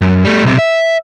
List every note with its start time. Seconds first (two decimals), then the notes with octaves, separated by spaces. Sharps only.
0.01 F#2
0.25 G3 A3
0.44 B1 C3
0.58 E5